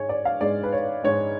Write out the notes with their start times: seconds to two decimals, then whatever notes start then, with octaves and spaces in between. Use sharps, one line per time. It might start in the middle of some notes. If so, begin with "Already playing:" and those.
Already playing: G#2 G#3 C#5 G#5
0.09 D5
0.25 F5
0.40 G#2 G#3 D5
0.63 B4
0.72 C#5
1.04 G#2 G#3 C#5